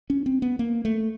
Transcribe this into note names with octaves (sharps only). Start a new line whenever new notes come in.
C#4
C4
B3
A#3
A3